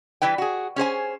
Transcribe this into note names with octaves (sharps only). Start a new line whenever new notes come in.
E3 G3 E4 B4 G5
F#4 G#4
C#4 G#4 C5 G#5